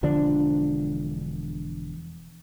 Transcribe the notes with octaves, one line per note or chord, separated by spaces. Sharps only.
E1 D3 F3 D4